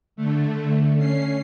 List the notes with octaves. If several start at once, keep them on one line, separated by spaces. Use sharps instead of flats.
D3 A3
C#4 C7